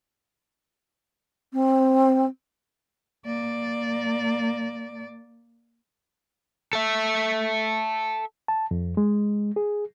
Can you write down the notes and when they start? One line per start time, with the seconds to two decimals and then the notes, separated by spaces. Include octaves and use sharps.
1.53 C4
3.25 A#3 D5
6.73 A4 E5
8.48 A5
8.71 F2
8.97 G#3
9.56 G#4